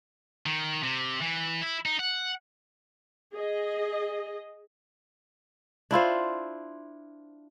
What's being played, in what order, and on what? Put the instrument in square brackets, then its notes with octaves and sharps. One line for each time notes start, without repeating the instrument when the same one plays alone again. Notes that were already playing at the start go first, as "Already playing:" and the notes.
[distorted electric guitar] D#3
C3
E3
E4
D#4
F#5
[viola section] G#4 D#5
[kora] D4 E4 F4 C5